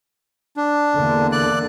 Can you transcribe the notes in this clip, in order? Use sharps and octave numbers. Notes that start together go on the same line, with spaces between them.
D4
E2 D3 A#3
D5 F#6